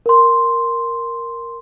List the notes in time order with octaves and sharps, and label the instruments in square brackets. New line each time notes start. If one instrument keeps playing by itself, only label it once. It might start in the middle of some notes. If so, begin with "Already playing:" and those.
[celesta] A#4 C6